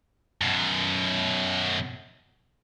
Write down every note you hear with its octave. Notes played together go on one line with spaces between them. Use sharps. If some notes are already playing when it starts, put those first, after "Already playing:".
F#2 B2